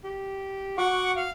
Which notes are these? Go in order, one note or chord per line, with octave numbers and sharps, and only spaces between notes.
G4
F#4 F#5 C#6 D6
F5